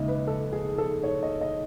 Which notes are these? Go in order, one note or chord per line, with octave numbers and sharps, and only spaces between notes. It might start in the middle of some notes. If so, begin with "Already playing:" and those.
Already playing: D#2 C#3 G#3 D#5 E5
B4
A4
G#4
A4
C#5
D#5
D#5